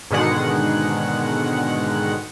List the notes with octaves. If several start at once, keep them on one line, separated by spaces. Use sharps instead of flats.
G#2 B2 D3 D#3 G#3 F#5